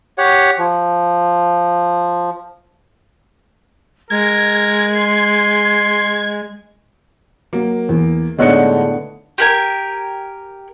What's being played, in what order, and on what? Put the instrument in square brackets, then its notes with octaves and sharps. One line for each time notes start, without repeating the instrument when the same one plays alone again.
[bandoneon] G4 C#5 F#5
F3
[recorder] G#3 [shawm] A#4 [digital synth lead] G#6
[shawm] C6
[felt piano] F#3 [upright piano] A#3
[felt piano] E2
[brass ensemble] A2 D3 [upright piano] G#3 D#4 C#7 [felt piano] B3 C#5 F#6
[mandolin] G4 A#4 G#5